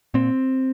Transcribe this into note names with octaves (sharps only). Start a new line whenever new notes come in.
A#2 C4